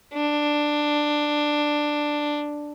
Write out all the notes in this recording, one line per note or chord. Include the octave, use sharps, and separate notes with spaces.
D4